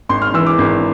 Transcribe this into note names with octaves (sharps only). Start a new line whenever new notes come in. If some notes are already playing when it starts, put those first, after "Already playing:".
G#1 C6
F6
E3 E6
D6
G#1